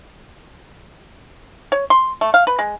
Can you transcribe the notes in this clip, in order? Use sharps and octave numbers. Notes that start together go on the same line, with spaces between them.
C#5
C6
A3
F5
B4
G#3